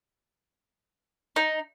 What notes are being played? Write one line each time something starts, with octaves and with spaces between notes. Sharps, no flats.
D#4